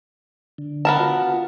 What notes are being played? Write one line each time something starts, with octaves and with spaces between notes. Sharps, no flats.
D3
B3 A#4 A5
F4 F#4